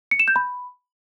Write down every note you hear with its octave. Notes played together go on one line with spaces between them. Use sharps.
C#7
E7
G6
B5